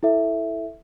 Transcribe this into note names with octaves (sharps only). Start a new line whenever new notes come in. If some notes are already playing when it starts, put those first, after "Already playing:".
E4 A4 E5